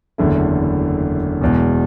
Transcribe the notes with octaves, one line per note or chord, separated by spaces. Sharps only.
F#1 E2 D3 A3 E4
E1 E2 B2